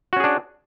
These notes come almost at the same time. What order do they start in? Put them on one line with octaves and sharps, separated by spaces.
F#4 C#4 G#4 D4